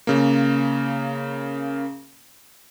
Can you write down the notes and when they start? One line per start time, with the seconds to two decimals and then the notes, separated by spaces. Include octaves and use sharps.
0.07 C#3 A#3